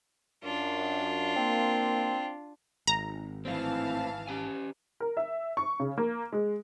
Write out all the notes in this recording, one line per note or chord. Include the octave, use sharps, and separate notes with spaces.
F#2 D4 F4
A#3 C4
G#1 A#5
A2 E3 C4 F5 A5
C#4 G4 G#5
A#4
E5
C#6
C#3
A#3
G#3